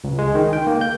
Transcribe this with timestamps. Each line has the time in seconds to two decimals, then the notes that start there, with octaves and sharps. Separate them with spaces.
0.04 C#2
0.19 G#3
0.35 D#3
0.53 G5
0.67 A#3
0.81 G6